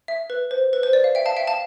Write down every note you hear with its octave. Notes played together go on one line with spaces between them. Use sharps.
E5
B4
C5
B4
C5
D5
F5
E5 G5
F5 A5
E5 G5
F5 A5